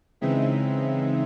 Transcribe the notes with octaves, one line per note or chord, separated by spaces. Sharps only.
C#3 E3 G#3 C4 D#4 E5